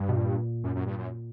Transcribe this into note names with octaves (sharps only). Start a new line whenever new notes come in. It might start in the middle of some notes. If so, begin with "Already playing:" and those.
Already playing: G2
B2
A#2
F#2
F#2
G2
F#2